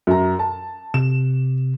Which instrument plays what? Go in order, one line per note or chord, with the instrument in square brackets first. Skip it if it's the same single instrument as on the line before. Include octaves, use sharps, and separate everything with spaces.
[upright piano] F#2 A#5
A5
[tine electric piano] C3 [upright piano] E7